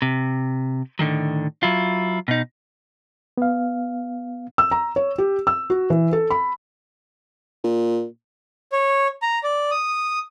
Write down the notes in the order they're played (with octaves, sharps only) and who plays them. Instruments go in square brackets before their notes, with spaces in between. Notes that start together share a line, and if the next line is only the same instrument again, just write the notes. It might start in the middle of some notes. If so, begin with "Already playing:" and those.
[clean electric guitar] C3
A2 D3 D#3 F#3
F#3 E4 F4
B2 D#4
[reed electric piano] B3 F5
[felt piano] E6
A#5
C#5
G4
E6
F#4
E3
A4
B5
[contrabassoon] A#2
[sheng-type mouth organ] C#5
A#5
D5
D#6